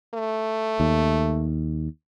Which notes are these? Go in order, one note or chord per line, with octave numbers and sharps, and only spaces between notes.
A3
D#2